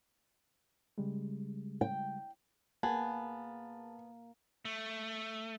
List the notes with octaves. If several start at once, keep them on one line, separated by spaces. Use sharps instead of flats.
C#3 G3 G#3
G5
A#3 B3 G#4 A5
A3